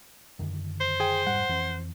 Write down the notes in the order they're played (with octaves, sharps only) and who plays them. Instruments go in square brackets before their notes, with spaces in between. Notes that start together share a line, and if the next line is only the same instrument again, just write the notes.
[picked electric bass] F#2 D3 D#3
[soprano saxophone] C5
[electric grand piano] G#4 G5
[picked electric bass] F1 G#2 G3 [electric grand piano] F#5
[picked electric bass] F2 E3 C4